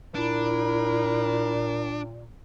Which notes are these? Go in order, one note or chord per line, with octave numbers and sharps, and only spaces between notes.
A#2 D4 E4 A#4